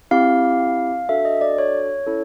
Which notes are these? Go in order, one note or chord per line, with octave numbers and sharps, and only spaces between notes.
C4 E4 G4 F5
D4 F#4 A4 E5
D#5
D5
C#5
C#4 E4 A4